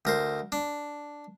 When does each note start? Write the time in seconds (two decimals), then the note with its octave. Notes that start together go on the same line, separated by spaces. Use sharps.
0.05 D2 A#4 C5
0.52 D4